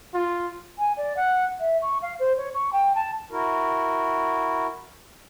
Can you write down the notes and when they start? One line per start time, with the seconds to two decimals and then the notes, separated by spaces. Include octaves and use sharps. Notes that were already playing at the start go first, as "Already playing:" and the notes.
0.14 F4
0.78 G#5
0.97 D5
1.16 F#5
1.59 E5
1.81 C#6
2.02 F5
2.19 C5
2.37 C#5
2.54 C#6
2.72 G5
2.95 A5
3.31 E4 F#4 A#4